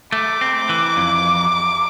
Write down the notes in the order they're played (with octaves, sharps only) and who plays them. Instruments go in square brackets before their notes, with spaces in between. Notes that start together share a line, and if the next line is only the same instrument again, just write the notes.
[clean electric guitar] A3 [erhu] D6
[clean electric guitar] C4
E3
F2